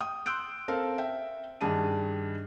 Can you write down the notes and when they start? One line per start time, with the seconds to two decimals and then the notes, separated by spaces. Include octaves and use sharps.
0.01 G5 D#6
0.26 C6 E6 F#6 G6 D7
0.68 C4 A4 A#4 F5
0.98 E5 G5
1.61 G2 D#3 D4 G#4 A5 D#7